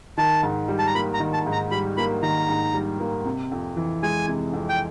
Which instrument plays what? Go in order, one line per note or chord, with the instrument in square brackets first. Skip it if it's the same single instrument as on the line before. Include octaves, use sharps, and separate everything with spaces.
[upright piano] D#3 [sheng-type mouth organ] A5
[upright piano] G#2
G3
[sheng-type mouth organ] A5
A#5
[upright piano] A#3 [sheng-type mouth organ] B5
[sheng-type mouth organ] A#5
[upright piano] D#3
[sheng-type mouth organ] A5
[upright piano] G#2
[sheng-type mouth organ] A#5
[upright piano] G3 [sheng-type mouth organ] B5
[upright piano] A#3 [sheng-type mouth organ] B5
[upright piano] D#3 [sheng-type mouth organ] A#5
[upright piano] G#2
G3
A#3
C3
F2
E3
[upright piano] G#3 [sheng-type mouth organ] G#5
[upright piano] C3
F2
[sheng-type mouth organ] G5